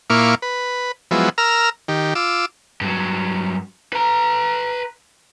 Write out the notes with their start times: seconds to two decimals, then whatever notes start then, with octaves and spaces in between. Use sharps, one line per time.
0.10 A#2 A#3 E4 F5 C#6 D6
0.42 B4
1.11 F3 F#3 G#3 B3 E4
1.38 A#4 A#5 E6 F6
1.88 D#3 G4
2.15 F4 D6 E6
2.81 G2 F#3
3.93 B4 A#5